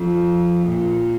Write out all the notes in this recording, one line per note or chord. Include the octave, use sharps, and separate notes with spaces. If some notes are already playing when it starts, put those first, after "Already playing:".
Already playing: F2
A#2